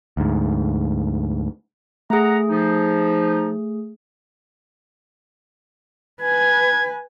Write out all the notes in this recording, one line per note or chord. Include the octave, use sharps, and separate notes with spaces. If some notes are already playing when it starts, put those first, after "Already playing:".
D2 G#2
A3 G#4 F#5 A#5
F3 D#4
B4 G#5 G#6